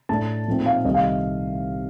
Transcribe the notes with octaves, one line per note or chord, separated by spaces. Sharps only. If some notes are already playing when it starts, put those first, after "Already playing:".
A2 A3 D4 A5
A#2 F3 A3 C4 D#4
F5
C2 C3 D#3 A3 D#5
F5